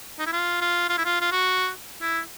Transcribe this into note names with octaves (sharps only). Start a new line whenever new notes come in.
D#4
E4
F4
F4
F4
E4
F4
F4
F#4
E4